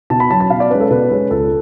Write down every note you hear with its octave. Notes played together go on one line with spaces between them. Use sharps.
B2 A5
B5
F#3 C#4 A5
A5
B2 F5
D5
G#3 C#4 B4
A4
B2 B4
G#3 C#4
C#2 A4